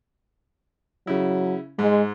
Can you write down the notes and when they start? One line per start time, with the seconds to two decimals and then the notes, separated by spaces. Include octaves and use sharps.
1.07 C#3 F#3 E4
1.79 G#2 G#3